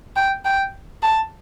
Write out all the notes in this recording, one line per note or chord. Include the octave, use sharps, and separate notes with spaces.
G5
G5
A5